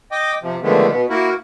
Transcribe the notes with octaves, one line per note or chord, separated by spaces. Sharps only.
D#5 G5 D6
C3 F3
D3 D#3 F3 G#3 A3 B3
B2 B3
A#3 E4 F#4 A#4